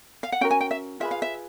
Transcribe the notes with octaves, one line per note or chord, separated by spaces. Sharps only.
F5
F#5
C#4 F#4 A#4 G5
G#5
G5
E5
F4 G#4 B4 E5
F5
E5